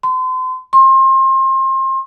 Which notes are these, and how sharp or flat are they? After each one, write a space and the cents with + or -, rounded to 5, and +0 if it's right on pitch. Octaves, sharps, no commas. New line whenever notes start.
C6 -35
C6 +30